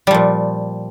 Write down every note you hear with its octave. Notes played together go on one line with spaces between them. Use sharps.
A#2 F3 G3